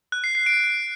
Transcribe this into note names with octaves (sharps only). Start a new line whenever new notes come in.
F#6
C7
C7
D7